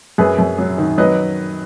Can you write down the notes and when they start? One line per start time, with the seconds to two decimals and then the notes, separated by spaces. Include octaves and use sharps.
0.18 F#2 G#4 B4
0.39 F#2
0.58 F#3
0.78 D#3
0.98 F#3 B4 D#5